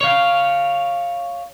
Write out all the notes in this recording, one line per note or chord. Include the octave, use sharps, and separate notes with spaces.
C#5 F5